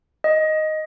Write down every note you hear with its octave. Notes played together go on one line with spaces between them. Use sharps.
D#5